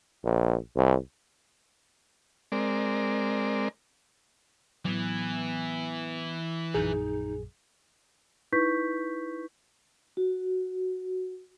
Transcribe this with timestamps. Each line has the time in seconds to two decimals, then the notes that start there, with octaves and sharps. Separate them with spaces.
0.24 A#1
0.76 C2
2.52 G#3 C4 A#4 D5
4.85 A2 E3 F#3 B3
6.75 A#1 F#2 D#4 G#4
8.52 D#4 E4 B4 C#6 G6 B6
10.17 F#4